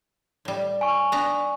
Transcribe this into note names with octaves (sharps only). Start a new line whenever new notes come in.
A2 G3
G#5 C#6
B3 D4 A#5